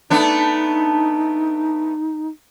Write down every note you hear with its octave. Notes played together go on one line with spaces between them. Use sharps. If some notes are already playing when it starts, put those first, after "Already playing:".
A3 B3 D4 D#4